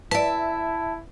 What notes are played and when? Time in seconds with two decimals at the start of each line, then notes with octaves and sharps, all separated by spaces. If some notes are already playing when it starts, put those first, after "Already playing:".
0.11 E4 B4 D5 E5 A5